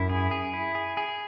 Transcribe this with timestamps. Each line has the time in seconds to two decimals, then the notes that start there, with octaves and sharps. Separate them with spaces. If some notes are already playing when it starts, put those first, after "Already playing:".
Already playing: F#2 E4
0.09 G#4
0.31 G#4
0.54 E4
0.75 G#4
0.97 G#4